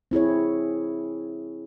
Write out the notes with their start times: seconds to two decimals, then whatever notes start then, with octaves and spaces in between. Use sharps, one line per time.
0.11 C4 E4 G#4 C#5